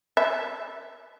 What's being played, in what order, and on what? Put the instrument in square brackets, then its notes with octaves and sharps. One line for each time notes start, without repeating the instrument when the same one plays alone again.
[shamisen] E5